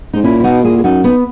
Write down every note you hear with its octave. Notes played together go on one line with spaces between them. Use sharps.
G#2 D#4
A#2 C#4 E4
E4
B2 D#4 F#4
A#2 E4 G#4
G#4
F#2 D#4 F#4
B3 D#4